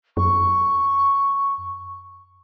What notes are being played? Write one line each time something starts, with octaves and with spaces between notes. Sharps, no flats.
F#2 C#6